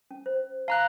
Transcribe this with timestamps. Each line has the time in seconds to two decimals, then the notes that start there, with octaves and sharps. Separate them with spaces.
0.11 C#4
0.26 C5
0.68 F5 A5 A#5 F#6